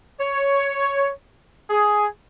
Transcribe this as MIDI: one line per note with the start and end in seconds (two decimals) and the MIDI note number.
0.20 1.10 73
1.70 2.07 68